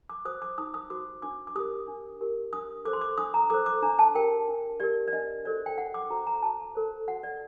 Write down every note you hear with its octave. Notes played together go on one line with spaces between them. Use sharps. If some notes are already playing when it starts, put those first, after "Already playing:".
D6
F#4 C5 D#6
D6
D#4 D#6
D#6
F#4 C5 D6
D4 D6
D6
G4 A#4 D#6
D4
G4 A#4
D4 D#6
A4 C5 D6
C6
D6
D4 D#6
A#5
A4 C5 D6
D6
D4 A#5
A5
G4 A#4 G5
D4
G4 A#4 D5
D5
D4 D#5
F#4 A4 C5 D5
G5
D4 F#5
D6
F#4 A4 C5 A#5
A#5
F#4 A5
A4 C5
F#4 F#5
D5